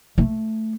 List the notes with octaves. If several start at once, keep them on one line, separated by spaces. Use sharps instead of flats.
A3